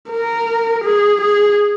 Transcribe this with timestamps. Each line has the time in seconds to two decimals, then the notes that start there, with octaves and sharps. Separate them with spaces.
0.10 A#4
0.85 G#4
1.21 G#4